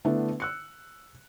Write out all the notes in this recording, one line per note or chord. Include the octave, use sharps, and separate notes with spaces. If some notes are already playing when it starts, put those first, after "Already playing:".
D3 A3 B3 D4 E4 B4
E6 F#6 C#7